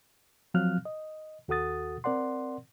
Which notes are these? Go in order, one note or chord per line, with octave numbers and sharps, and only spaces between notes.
F3 F#3 C4 F5 F6 F#6
D#5
D#2 F#4 A4 F#5 D#6 A6
C4 A#4 D5 F#5 C6